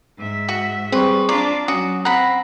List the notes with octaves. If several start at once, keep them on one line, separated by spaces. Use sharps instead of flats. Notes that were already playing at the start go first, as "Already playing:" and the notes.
G#2 E5
F#4
G3 C4 G#4 B4 C6 C#6
D4 F4 D5 A#5
F#3 C#4 F#4 D#6
C4 F#5 A#5 B5 A#6